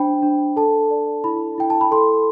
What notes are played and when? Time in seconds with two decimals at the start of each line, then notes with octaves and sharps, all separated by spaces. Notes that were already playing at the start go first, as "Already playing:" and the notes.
Already playing: D4 C5 G5 B5
0.22 D4
0.56 A4 A5
0.91 D5
1.24 E4 B5
1.58 E4 G5
1.70 A5
1.81 B5
1.91 A4 C6